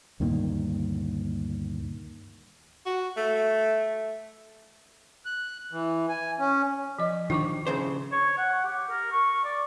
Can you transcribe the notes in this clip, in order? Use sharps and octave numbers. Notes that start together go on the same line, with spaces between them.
D2 G2 A#2 D#3
F#4
A3
F#6
E3
G#5
C#4
F3 D#5
D#3 F3 D4 C#6 D6
A2 C#3 C5
C#5
F#5
G4
A#4
C#6
D5